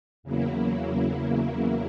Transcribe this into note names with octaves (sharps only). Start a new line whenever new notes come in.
E2 C#3 F#3 A#3 E4